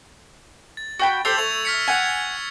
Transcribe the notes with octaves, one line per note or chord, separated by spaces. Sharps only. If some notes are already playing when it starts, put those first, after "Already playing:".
A6
F#4 G5 B5
G4 A4 C5 E6 A6 F7
A3 C#6 G#6 F7
F6 B6 C#7
F#5 G#5 G#6 C#7 F7